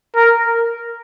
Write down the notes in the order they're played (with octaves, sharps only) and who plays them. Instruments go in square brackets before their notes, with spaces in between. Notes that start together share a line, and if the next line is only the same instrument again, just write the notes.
[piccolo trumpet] A#4